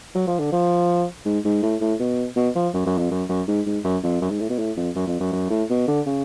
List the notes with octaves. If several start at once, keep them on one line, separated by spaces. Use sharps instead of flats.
F#3
F3
D3
F3
G#2
G#2
A2
A2
B2
B2
F3
F#2
F#2
F2
F#2
F#2
G#2
G#2
F#2
F2
F#2
G#2
A2
B2
A2
F2
F#2
F2
F#2
F#2
A2
B2
D3
C#3